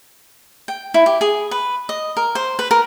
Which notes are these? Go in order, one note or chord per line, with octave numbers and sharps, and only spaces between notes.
G5
E4
G4
G#4
B4
D#5
A#4
C5
B4
A#4